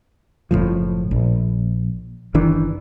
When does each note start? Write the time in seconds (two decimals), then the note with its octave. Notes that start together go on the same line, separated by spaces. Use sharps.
0.51 F#1 C#2 A2 F3
1.11 A#1
2.34 F#1 D#3 E3 D4